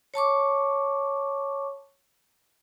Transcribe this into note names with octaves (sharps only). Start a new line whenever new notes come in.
C#5 A5 C#6 D6